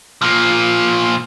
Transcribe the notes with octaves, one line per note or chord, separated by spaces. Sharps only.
A#2 F3